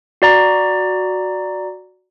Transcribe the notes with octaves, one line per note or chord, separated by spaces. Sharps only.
F#4 D5 A#5